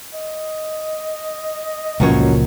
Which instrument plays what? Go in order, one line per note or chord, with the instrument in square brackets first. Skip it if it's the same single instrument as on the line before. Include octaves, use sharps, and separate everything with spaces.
[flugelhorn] D#5
[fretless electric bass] C#2 A#2 F3 [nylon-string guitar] F#2 C#4 C#5